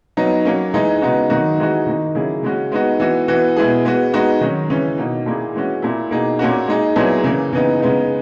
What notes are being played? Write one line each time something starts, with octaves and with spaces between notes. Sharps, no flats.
F#3 B3 D#4
F#3 A#3 C#4
E3 G#3 D#4
C#3 G#3 B3 D#4 F#4
D#3 F#3 A#3 D#4 F#4
E3 G#3 D#4 F#4
D#3 A#3 D#4
C#3 F#3 A#3 E4 G#4
C#3 G#3 C#4 F#4
G#3 B3 D#4 F#4
E3 B3 F#4
E3 B3 F#4
B2 G#3 B3 E4 G#4
G#3 B3 F#4
G#3 B3 D#4 F#4
D#3 F#3 C#4
C#3 E3 G#3 C#4
B2 A#3 D#4
A#2 A#3 E4 G#4
E3 G#3 C#4 F#4
A#2 A#3 E4
B2 A#3 D#4 G#4
A#2 A#3 C#4 F#4
G#3 D#4 G#4
A#2 F#3 B3 E4 G#4
C#3 E3 A#3
C#3 E3 B3 D#4
C#3 G#3 B3 D#4